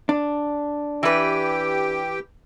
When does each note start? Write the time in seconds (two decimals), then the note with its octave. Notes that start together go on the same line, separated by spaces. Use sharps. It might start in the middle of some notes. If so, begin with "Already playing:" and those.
0.09 D4
1.03 E3 G4 B4 G5